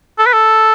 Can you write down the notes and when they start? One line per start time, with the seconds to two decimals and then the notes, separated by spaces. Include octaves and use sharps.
0.19 A4
0.26 B4
0.33 A4